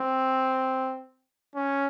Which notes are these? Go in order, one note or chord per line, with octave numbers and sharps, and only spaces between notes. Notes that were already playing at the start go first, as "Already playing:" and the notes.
Already playing: C4
C#4